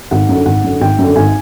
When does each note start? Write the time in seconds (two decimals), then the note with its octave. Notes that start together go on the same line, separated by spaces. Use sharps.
0.11 G#1 F#5
0.29 F#2 D3
0.46 G#1 F#5
0.64 F#2 D3
0.81 G#1 G5
0.98 F#2 D3
1.15 G#1 G#5